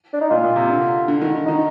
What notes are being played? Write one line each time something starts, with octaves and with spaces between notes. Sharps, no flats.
D4
D#4
A#2 F4
A#2
C3
D3
D3
D#3
D3
D#3 D#4